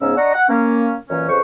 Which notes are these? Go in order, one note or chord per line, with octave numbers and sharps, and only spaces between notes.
G#2 C#3 B3 C#4 E6
D4 D5 D#5 F#5 A#5 C#6
F#5
A#3 C#4
F#2 A#2 E3 C#4
F2 C#3 B4 C5 C#6